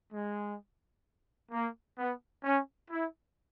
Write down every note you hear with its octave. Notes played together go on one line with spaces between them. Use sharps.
G#3
A#3
B3
C#4
E4